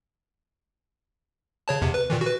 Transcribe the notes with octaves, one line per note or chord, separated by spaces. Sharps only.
C#3 C#5 A5
E2 C3
B4
A#2 D#3 E3
F#4 B4